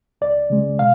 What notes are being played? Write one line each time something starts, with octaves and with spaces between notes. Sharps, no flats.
C#2 D5
C#3 G#3
B2 F5